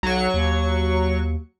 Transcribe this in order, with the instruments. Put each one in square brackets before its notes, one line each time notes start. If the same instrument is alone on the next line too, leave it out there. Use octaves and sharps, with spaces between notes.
[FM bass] B1 [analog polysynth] F#3 C#6
[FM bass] D#2